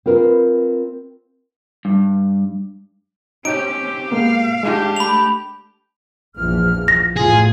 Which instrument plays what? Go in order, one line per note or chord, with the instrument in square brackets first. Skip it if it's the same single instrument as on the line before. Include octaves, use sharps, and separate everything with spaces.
[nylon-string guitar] C4 F4 A#4 B4
[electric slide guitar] G2
[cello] C4 C#4 [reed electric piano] D#4 G6 [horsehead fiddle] G4 [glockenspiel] D7
[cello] C4
[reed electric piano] G#3 A#3 B3 [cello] F5
[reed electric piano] G#3 [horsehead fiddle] D4 G4
[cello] A3 [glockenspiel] B5 F7
[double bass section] A#1 E3 F3 [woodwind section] E2 F6
[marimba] A#6
[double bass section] E2 A2 [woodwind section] F4 [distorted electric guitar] G#4